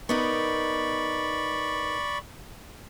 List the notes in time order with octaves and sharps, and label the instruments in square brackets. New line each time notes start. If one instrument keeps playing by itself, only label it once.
[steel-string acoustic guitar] B3 D#4 A#4 [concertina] D5 B5 C#6